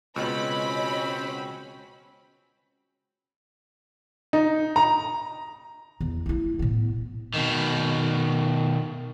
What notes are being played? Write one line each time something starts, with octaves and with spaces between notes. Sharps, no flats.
C#2 B2 C4 C#4 F#4 D#5 B5
D#4
A#5
E2
A3 E4
A2 B3
B2 D#3